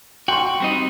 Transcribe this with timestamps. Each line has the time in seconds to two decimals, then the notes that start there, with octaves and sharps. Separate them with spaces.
0.28 F#4 G5 C6 C#6
0.60 G3 C4 D#4